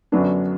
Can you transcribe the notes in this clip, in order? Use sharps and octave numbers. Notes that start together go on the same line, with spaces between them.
F#2 D3 F#3 B3 D4